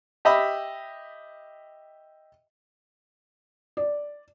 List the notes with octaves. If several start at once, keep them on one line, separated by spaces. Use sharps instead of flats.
G4 D#5 E5 B5
D5